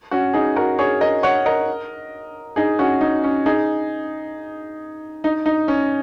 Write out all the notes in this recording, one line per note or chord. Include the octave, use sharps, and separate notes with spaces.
C#4 F#4
D#4 G#4
F#4 A#4
G#4 C#5
A#4 D#5
C#5 F#5
A#4 D#5
D#4 G#4
C#4 F#4
D#4
C#4
D#4 G#4
D#4
D#4
C#4